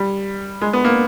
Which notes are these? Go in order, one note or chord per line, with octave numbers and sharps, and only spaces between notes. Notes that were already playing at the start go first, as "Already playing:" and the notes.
Already playing: G3
G#3
B3
A#3